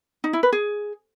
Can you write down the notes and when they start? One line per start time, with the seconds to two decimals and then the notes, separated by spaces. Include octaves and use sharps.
0.24 D#4
0.33 E4
0.43 B4
0.53 G#4